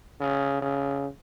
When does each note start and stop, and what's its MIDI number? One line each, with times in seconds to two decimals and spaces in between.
0.20 0.60 49
0.61 1.06 49